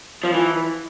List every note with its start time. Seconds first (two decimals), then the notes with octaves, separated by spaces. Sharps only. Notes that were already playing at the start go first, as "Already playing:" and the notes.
0.24 F3
0.33 E3